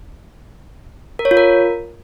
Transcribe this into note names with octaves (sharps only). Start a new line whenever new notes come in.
A#4
C#5
F4
A#4